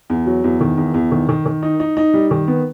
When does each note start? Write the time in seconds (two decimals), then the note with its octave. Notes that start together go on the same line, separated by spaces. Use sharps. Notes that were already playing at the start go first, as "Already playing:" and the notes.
0.10 E2
0.26 F#3
0.44 E2
0.61 D#3
0.77 E2
0.94 E2
1.12 D#3
1.29 D#3
1.46 D#3
1.63 D#4
1.80 D#4
1.97 D#4
2.14 G3
2.31 D#3
2.48 B3